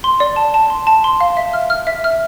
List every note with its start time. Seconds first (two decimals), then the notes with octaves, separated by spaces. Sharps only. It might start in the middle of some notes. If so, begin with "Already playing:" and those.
0.04 C6
0.20 D5
0.36 A5
0.54 A5
0.70 C6
0.87 A5
1.04 C6
1.21 F5
1.37 E5
1.53 F6
1.70 F6
1.87 E5
2.04 F6